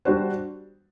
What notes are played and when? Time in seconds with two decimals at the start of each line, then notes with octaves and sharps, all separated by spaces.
0.05 G3 D4 F#4 C5